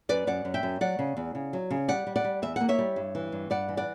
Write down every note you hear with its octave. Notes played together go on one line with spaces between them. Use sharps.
F#2 B4 D5
F#2 D5 F#5
F#2
E5 G5
F#2
F#3 D5 F#5
C#3
E2
C#3
F#3
C#3
G3 D5 F#5
G3
D5 F#5
G3
E2 E5
A#3 F#5
C#5 E5
G3
G2
E3
G2
G2 D5 F#5
E3
D5 F#5